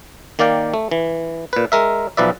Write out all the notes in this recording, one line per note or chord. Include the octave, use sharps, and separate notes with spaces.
D#3 A#3 D5 F5 G5
A3
E3
A#2 B4
G#3 A#4 E5
B1 F3 B4 D5 E5